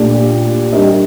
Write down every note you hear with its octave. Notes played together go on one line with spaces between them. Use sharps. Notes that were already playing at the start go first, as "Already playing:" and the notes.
Already playing: A#2 A3 D4 G4 D5
G3 D4 G4 A#4 D#5